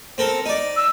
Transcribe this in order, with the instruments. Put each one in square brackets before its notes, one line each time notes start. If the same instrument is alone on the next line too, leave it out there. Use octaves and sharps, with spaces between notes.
[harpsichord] C4 A4 A#4
D#4 D5
[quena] E6